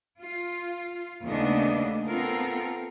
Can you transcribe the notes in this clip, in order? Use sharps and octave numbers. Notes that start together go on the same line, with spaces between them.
F4
D#2 C#3 A3 B3 D4 D#5
B3 C4 F4 A4 A#4